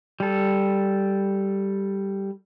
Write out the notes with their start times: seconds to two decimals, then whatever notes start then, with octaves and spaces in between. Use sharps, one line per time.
0.20 G3 A4